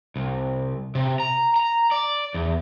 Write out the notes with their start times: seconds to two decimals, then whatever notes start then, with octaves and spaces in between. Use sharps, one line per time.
0.16 C2
0.95 C3
1.20 A#5
1.56 A#5
1.91 D5
2.34 E2